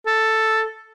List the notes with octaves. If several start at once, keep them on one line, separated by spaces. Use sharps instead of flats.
A4